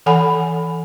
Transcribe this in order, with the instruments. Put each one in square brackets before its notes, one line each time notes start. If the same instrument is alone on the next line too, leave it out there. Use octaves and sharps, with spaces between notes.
[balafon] E3 A4 F#5 G#5 B5